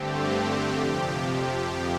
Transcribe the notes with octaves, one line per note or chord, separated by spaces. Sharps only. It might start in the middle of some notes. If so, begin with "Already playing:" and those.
Already playing: G2 D3 A3 C4 G4
F2 C3 F3
G4